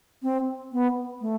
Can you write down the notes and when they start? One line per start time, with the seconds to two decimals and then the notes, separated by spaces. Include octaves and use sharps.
0.23 C4
0.72 B3
1.21 A3